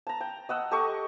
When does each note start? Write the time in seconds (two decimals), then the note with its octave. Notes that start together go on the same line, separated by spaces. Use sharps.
0.07 A5 A#5
0.21 G5
0.49 D#5 F#5 E6
0.71 G4 A4 D#5 C#6